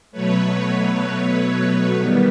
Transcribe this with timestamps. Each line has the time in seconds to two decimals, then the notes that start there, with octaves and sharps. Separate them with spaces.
0.11 B2 F#3 A3 B4 C#5
1.96 D#3 G3 B3